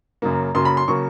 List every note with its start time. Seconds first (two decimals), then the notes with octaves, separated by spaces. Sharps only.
0.22 F#2 C#3 F#3 A#3
0.55 F#2 C#3 F#3 A#3 C6
0.65 B5
0.77 C6
0.88 C#3 F#3 A#3 C#6